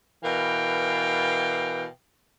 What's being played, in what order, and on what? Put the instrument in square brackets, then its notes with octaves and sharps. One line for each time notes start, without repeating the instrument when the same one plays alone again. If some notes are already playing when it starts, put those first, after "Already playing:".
[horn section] B2 E3 A#4 F5 G5